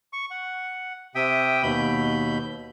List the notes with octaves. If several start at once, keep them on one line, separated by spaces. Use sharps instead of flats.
C#6
F#5
C3 E5 G5 D#6
D#2 B2 B5 G6